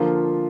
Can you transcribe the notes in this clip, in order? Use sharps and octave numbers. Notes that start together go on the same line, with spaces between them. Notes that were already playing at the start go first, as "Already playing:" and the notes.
Already playing: D3 F3 A#3 F4